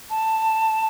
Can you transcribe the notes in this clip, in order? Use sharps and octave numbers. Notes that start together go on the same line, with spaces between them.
A5